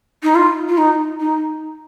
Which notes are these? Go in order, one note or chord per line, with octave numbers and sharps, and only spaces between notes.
D#4
F4
F4
D#4
D#4